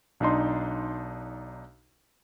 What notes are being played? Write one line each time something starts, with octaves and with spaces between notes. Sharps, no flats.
B1 D4 D#4 C6